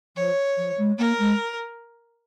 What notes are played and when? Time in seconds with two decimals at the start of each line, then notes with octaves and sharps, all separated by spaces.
0.16 F3 C#5
0.57 F3
0.77 G#3
0.98 A#3 A#4
1.18 G#3